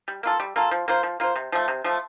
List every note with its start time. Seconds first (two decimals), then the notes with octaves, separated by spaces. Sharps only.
0.08 G3
0.23 A#3 F4 A4
0.40 G3
0.56 A#3 F4 A4
0.71 F3
0.88 A#3 F4 C5
1.03 F3
1.20 A#3 F4 C5
1.36 C3
1.52 F3 A3
1.68 C3
1.84 F3 A3